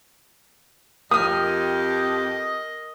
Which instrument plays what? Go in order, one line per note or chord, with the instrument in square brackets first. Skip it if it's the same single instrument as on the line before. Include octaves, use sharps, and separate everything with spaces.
[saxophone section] F2 G4 [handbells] A#4 F6 [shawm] D#5 [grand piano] D#6